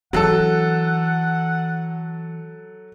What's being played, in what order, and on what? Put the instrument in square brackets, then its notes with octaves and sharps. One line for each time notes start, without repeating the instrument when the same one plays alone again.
[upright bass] E3 C4 [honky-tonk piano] F#3 A4 [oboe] F#5